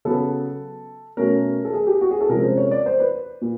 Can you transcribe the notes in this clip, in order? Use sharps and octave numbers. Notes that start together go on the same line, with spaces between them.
C#3 F#3 B3 A4
B2 F#3 A3 C#4 A#4
A4
G#4
G4
F#4
G#4
A4
C3 F3 G#3 C#4 A#4
C5
C#5
D5
C5
B4
A#2